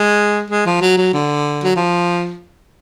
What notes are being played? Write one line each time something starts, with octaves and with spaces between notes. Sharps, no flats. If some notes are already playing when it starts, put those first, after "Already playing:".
Already playing: G#3
G#3
F3
F#3
F#3
D3
F#3
F3